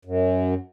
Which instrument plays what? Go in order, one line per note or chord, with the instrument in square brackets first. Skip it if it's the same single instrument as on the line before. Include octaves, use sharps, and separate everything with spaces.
[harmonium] F#2